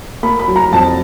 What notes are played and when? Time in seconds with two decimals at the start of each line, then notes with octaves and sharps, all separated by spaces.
0.23 A#3 B5
0.39 B5
0.48 F#3
0.56 A#5
0.72 F2 A5